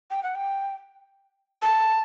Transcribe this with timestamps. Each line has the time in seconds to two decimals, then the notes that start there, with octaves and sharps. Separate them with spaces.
0.11 G5
0.23 F#5
0.35 G5
1.62 A5